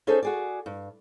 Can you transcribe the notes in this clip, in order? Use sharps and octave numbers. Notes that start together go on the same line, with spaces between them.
C#4 D#4 G#4 A4 C5
F#4 G#4 D5
G2